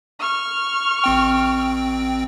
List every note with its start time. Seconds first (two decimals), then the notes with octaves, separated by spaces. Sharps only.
0.19 C#6 F6
1.04 A1 C4 G5